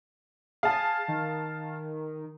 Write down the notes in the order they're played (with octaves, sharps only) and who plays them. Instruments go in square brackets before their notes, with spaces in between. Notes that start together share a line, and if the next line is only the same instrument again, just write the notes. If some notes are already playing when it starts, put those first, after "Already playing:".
[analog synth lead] G#4 [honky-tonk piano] F5 A5
[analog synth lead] D#3